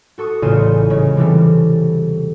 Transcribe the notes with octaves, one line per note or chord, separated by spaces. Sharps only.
F#4 A4 C#6 D#6
A1 E2 C#3 F4 D#7 E7
C#3 G#3 C#4
C3 E3 G3 A4